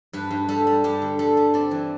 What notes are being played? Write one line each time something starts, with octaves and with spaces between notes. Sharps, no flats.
G2 B4
G2
G3 A4
G3
G2 G4
D3
G3 A4
G3
C4 D5
E3